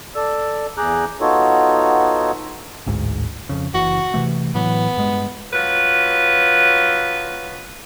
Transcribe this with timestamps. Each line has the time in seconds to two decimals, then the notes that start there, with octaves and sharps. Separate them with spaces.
0.15 A4 D5 E6
0.78 E2 G#4 A#5 D6 F#6 G6
1.20 B3 D#4 F4 F#4 A4 C#5
2.86 A1 D2 G#2
3.49 F2 C#3
3.74 F#1 E3 F#4
4.14 C3 E3 A3
4.55 A2 E3 F#3 B3
4.97 G2 G#3
5.52 F3 F#3 B4